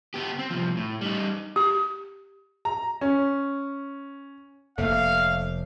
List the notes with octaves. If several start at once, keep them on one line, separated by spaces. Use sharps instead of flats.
B3 G4
C4
C2 F3
A2
G3 D#4
G4
A#5
C#4
F1 A3 A#3 F5